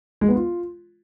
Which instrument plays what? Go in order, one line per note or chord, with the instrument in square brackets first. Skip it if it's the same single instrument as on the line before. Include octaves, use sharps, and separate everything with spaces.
[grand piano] G#3
B3
F4